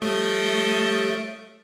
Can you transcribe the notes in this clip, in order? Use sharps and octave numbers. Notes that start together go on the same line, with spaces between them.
F3 G3 A3 G4 A4 C#5 D#5